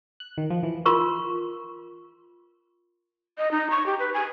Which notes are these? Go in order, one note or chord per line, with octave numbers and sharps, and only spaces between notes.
F#6
D#3
F3
E3
F4 A#4 C6 C#6
D#5
D#4
C#6
G4
B4
G#5